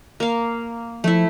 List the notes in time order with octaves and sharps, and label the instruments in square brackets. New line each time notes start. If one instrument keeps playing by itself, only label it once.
[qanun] A#3 F5
[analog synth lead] F3 [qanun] A3 E4